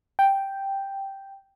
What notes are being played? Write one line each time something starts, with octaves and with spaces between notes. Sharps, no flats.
G5